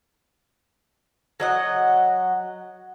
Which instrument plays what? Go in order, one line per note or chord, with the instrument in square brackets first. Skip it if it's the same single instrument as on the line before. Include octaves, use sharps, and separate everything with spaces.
[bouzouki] F#3 D#5 F#5